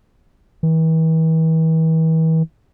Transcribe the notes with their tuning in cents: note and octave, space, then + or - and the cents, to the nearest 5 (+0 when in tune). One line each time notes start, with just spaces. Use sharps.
E3 -40